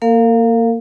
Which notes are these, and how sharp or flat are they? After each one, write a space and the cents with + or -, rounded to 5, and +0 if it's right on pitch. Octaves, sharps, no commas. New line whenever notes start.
A#3 -10 A#4 -40 F5 +0